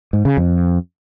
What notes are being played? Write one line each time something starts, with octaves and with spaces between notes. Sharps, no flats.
G#2
C#3
F2